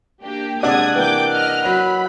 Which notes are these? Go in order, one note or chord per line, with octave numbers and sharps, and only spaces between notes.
A#3 D4 G4
C3 G#3 D4 D5 F#5 D#6 G#6
E3 A#3 G5 D6 G6
D#5 F6
F#3 B5